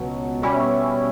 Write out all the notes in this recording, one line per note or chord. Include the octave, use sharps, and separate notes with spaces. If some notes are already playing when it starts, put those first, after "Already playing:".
Already playing: C#2 B2 F#3
B2 G3 C#4 E4